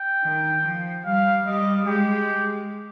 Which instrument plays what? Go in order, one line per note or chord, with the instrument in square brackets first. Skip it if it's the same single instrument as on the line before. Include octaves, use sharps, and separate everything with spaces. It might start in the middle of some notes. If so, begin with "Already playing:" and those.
Already playing: [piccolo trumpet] G5
[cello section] D#3
F3
[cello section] G3 [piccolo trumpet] F5
[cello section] G3 [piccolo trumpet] D#5
[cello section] G#3 [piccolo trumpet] G4